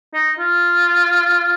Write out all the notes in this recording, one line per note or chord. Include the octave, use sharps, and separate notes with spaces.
D#4
F4